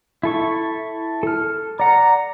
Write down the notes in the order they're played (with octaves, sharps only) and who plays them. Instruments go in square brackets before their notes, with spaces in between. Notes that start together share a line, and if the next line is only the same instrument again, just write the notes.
[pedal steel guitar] E4 A4 C#6
A4 F6
[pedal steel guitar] D5 F#5 [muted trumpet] A#5